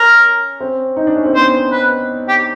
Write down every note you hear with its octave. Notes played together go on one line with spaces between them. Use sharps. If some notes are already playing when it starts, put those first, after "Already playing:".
Already playing: C#4 A#4
C4
D#4
D4
C#4
C4
B3 C5
B4
G4